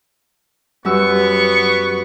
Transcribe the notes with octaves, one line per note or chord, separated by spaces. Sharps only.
F#2 F#3 G3 B3 G4 B4 C#6 E6